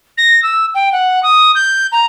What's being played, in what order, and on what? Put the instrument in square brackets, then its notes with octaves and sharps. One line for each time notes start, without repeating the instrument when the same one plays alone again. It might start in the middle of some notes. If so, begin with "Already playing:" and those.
[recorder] A#6
E6
G5
F#5
D#6
G6
A#5